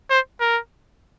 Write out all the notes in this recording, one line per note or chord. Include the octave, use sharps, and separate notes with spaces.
C5
A#4